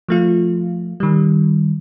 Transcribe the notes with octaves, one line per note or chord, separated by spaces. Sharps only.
F3 A3 F4
D#3 G3